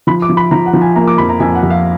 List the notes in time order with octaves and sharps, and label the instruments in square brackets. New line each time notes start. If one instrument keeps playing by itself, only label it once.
[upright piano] F3 B5
D6
F3
B5
F3 A#5
F#5
F3
G#5
A#3 A#5
D6
F2 B5
A#5
F2 G#5
F#5
F2
F5